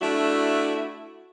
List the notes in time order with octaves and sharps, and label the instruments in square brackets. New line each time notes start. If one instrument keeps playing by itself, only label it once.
[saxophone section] A3 D4 E4 F#4 E5